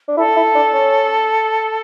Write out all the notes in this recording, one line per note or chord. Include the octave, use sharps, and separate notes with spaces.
D4
E4 A4
E4
D4
C#4